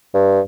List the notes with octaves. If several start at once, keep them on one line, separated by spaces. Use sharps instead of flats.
G2